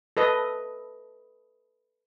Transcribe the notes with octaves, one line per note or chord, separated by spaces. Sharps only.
A4 B4 D#5